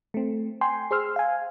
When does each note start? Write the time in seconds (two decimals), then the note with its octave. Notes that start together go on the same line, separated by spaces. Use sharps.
0.14 A3 C4
0.61 G5 G#5 C6
0.91 G#4 C5 C6 E6 F6
1.16 F5 G#5